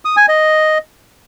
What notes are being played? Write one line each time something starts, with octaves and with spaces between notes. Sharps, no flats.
D#6
G#5
D#5